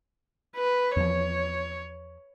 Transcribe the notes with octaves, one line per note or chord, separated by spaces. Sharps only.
B4
E2 F3 C#5